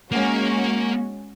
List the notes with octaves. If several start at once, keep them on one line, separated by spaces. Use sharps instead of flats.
G#3 A#3 C#4 F#4